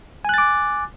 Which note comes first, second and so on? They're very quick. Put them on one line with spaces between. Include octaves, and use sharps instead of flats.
G#5 F#6 A6 D6